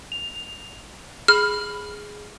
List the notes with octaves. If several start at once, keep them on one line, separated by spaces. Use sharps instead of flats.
F7
G#4 B5 F6